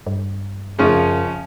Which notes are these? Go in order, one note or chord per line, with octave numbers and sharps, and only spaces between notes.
G2
F#2 C#3 F3 C#4